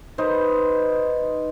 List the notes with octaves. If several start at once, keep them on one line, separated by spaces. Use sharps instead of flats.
D#4 B4 C5